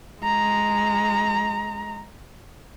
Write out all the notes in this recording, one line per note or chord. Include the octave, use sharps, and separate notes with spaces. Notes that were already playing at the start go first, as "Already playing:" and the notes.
G#3 A#5